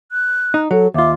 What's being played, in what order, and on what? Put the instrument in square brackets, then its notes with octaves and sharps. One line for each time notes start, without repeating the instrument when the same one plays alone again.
[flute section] F#6
[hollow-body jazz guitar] D#4
[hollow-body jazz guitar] F#3 [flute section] A4
[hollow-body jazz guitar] D#2 F4 [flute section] E5 D6